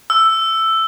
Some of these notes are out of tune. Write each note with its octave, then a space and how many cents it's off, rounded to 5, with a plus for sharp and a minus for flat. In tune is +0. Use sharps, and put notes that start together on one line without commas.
E6 +5